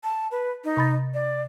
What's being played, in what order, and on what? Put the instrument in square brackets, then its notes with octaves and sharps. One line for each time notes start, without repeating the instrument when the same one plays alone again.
[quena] A5
B4
D#4
[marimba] C3 B5 A6
[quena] D5